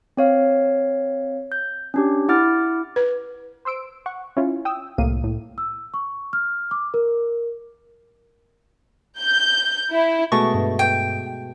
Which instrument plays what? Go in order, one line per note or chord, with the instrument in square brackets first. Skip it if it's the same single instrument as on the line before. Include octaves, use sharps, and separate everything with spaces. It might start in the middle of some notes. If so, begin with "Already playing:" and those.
[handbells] C4 C#5 F5
G6
C#4 D4 G4
E4 F#5 D6 F6 A6
[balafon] B4
[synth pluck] C5 C6 E6 D7
F#5 C#6
C#4 E4 F4
G5 D#6 E6
C2 A2 A#3 F5 D#7
A2
[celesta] E6
C#6
F6
D6
A#4
[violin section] G6
E4
[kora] B2 G#3 A3 [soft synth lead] C#6
[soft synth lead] G2
[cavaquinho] G5